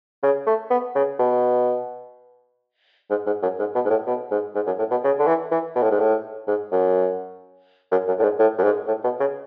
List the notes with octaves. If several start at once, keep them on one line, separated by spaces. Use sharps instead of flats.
C#3
A3
B3
C#3
B2
G#2
G#2
F#2
G#2
B2
G#2
A2
B2
G#2
G#2
F#2
A2
B2
C#3
D3
E3
E3
B2
A2
G#2
A2
G#2
F#2
F#2
F#2
A2
G#2
A2
F#2
G#2
A2
B2
C#3